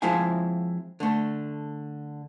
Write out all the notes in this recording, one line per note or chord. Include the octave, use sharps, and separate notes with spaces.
F3 G#3 C4 E4 F5 G#5
D3 A3